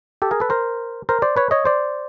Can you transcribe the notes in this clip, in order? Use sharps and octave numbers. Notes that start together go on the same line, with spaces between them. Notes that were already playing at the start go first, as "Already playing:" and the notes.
G4 A4
G#4 A#4
A4 B4
A#4 C5
A#4 C5
C5 D5
B4 C#5
C#5 D#5
C5 D5